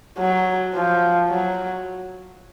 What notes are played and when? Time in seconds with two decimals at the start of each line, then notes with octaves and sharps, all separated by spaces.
0.18 F#3
0.74 F3
1.29 F#3